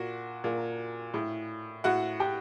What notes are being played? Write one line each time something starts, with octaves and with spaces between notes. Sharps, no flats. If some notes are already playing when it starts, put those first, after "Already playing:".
Already playing: A#2 F#4
A#2
A2
A2 F#4 F#5
G4 G5